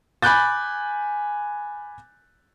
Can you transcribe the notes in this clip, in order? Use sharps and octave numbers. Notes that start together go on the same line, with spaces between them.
G#5 B5 D6 F#6 G6 A6